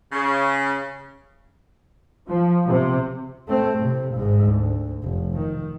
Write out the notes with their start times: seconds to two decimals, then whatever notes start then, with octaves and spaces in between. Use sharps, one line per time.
0.12 C#3
2.28 F3
2.67 C3
3.48 A3 C4
3.78 A2 C3
4.13 G#1 G#2
4.46 D2
5.04 F1
5.34 D#3